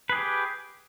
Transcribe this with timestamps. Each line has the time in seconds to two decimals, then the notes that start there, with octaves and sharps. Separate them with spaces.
0.09 B4
0.12 G#4
0.15 G4